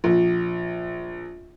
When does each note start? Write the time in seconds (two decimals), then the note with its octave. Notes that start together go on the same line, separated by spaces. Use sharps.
0.04 A#1